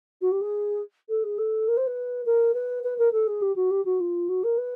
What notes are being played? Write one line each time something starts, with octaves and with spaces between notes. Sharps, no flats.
F#4
G4
G#4
A4
G#4
A4
A#4
C5
B4
A#4
B4
B4
A#4
A4
G#4
G4
F#4
G4
F#4
F4
F#4
A#4
B4